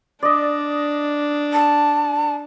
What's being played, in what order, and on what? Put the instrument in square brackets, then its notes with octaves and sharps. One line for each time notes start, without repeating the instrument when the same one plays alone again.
[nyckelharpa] D4 [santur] D5 D#5
[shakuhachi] A5